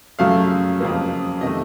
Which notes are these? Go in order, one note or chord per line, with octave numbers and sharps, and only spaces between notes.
F#2 C#3 F#3 A3 F5
F2 C#3 F#3 A#3
C3 D#3 A3 D#5